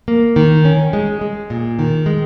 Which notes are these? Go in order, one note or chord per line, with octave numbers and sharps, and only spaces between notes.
A#3
D#3
C#4
G#3
G#3
A#2
D#3
G#3